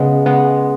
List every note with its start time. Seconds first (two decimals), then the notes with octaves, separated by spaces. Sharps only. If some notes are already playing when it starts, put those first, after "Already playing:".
Already playing: C#3 G#3 B3
0.26 C#3 G#3 B3